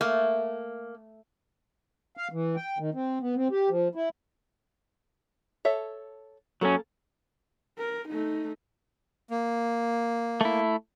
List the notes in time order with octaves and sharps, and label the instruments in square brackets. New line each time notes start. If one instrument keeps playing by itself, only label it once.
[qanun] A3 [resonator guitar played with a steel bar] A#3
[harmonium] F5
E3
G5
D#3
C4
B3
C4
G4
F3
E4
[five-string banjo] A4 C#5 E5
[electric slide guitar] F#3 C#4 [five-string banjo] A#3 A4
[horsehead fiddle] A#4
A3 D#4
[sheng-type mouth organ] A#3
[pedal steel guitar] A3 E4